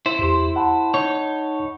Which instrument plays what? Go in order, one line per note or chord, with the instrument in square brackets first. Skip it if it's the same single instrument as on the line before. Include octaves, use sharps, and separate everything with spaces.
[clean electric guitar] E4 C5
[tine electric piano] E2 G4 C6
F#5 A5 B5
[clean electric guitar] D#4 C#5